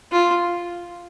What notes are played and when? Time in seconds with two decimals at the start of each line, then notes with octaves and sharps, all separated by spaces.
0.12 F4